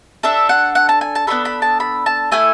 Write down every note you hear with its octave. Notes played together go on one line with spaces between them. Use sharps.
D4 A4 E5
F#5
F#5
A5
G#5
A5
B3 D4 F#4 A4 B5
B5
A5
B5
A5
A3 E4 A4 G#5